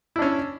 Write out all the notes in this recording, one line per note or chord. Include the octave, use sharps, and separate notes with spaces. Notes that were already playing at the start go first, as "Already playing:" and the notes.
C#4 D4 E4